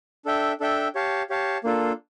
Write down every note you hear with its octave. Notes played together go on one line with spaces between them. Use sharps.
D4 A4 E5 G5
D4 A4 E5 G5
G4 C#5 F5 A5
G4 C#5 F5 A5
A#3 D4 F4 A4